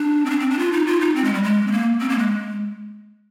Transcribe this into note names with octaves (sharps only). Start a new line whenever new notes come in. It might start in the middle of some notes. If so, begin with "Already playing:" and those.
Already playing: D4
C4
D4
C4
D4
F4
D#4
F4
D#4
C4
G#3
G3
G#3
C4
A#3
C4
A#3
G#3